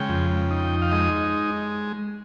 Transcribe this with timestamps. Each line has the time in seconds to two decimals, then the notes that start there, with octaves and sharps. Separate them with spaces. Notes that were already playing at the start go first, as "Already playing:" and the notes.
Already playing: C#3 G#3 G5
0.09 F2
0.51 D#4
0.82 F5
0.91 G#3 D#5